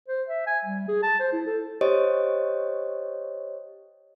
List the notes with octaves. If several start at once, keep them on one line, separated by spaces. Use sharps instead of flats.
C5
E5
G#5
G3
G#4
A5
C5
E4
A4
G4 C5 C#5 D#5